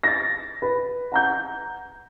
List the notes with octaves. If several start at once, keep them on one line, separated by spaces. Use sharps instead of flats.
A6 A#6
B4
F#5 A#5 G6